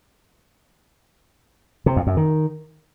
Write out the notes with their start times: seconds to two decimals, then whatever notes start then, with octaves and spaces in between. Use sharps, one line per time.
1.86 C3
1.96 F2
2.07 F#2
2.17 D#3